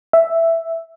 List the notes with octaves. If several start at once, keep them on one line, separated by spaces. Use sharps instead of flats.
E5